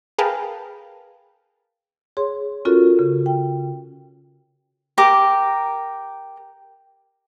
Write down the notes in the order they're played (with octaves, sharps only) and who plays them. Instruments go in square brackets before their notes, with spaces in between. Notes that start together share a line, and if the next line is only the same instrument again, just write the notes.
[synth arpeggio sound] G#4 A#4 B4 F5 G5 A5
[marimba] G#4 C#5 C6
C#4 F4 F#4 A4 A#4
C#3
G5
[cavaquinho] G4 A#4 D6